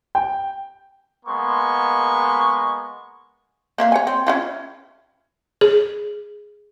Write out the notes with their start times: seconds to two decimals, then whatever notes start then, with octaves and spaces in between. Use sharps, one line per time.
0.15 G5
1.26 G#3 A#3 B3 C6 C#6
3.78 A#3 E5 F5
3.92 C#5 G#5
4.07 C4
4.27 C#4 E4 F4
5.61 G#4